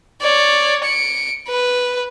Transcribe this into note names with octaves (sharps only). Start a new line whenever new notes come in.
C#5 D5
C#7 D7
B4